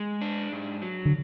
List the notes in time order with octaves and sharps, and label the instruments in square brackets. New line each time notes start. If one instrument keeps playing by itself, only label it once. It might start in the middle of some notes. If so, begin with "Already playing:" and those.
Already playing: [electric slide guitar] G#3
D4
G#2
F#3
[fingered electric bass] D3